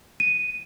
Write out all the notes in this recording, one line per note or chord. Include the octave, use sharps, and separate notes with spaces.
D#7